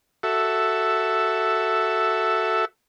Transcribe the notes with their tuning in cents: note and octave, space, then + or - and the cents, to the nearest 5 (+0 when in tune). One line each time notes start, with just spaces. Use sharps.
F#4 +10 A4 +5 E5 +0